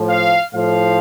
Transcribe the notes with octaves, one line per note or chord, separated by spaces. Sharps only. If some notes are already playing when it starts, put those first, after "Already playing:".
Already playing: A2 F3
F5
A2 F3 F5